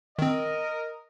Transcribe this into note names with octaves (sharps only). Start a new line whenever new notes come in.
D#3 C4 A#4 D#5